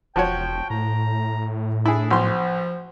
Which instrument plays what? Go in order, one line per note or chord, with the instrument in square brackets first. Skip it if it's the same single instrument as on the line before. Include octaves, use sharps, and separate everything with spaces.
[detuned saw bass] E1 [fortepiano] F3 F#4 C#5 [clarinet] G5
[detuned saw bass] A2 [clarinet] A#5
[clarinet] D4 [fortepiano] E4 G#4
[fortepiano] B1 C6 [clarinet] F3